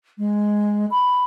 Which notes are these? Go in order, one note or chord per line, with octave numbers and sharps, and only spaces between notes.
G#3
B5